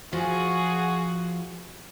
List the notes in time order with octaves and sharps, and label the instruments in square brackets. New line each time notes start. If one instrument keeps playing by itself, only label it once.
[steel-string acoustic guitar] F3 [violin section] F#4 G#4